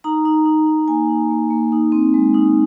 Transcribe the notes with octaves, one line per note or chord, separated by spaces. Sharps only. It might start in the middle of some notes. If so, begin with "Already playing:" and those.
D#4 A#5
D#4
D#4
D#4
A#3 G#5
D#4
A#3
A#3
D#4
C4
G#3
D#4